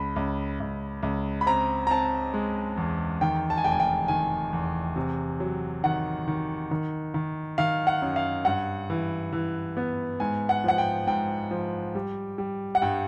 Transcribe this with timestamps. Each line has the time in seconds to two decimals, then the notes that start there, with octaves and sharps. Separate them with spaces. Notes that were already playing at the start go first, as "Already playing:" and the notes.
Already playing: C#2 B5
0.16 C#2
0.60 C#2
1.03 C#2
1.41 B5
1.46 C4 A#5
1.87 A#5
1.90 C4 A5
2.34 G#3
2.77 E2
3.21 D#3 G5
3.50 A5
3.58 G#5
3.64 F1 G5
3.72 G#5
3.80 G5
4.08 D#3 G#5
4.53 E2
4.96 C3
5.40 F#3
5.84 D#3 F#5
6.28 D#3
6.71 D#3
7.14 D#3
7.58 D#3 F5
7.87 F#5
8.02 F#2
8.16 F5
8.45 G2 F#5
8.90 E3
9.33 E3
9.77 B3
10.20 G#2 G#5
10.49 F#5
10.64 F3 F#5
10.78 G5
11.07 G#2 G5
11.51 F3
11.95 G3
12.38 G3
12.75 F#5
12.82 G2 G5